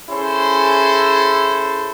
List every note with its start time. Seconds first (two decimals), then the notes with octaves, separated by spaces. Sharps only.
0.10 C#4 E4 G#4 A4 C5